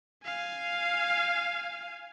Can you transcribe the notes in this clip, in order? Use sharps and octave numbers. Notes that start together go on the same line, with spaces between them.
F5 G#5